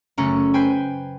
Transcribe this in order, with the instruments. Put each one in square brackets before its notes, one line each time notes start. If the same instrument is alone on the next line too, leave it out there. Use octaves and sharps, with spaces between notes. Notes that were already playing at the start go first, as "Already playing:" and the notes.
[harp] F#1 A3 C#4 A#5 C#7
B4 C5 G5 G#5